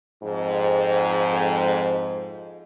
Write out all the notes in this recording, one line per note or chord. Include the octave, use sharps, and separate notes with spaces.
F2 G#2